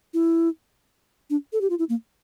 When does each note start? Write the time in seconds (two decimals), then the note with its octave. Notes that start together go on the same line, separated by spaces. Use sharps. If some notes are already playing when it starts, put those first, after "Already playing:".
0.14 E4
1.30 D4
1.53 A4
1.61 G4
1.70 F4
1.79 E4
1.89 A#3